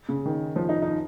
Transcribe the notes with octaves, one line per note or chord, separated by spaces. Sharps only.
C#3
D#3
F3
D#4
D#4